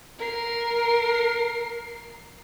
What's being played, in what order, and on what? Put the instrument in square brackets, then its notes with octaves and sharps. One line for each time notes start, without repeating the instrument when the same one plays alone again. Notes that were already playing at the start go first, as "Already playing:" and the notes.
[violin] A#4 C7